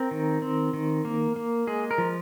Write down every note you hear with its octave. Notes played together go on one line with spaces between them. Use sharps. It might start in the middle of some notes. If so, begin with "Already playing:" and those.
Already playing: C4 A#4
D#3
C4
D#3
A#3
A#3
G#3 G#4
A#4
F3